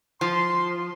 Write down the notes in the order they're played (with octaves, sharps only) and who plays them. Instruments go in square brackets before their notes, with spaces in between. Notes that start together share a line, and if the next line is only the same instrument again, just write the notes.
[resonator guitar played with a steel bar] F3 [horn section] C6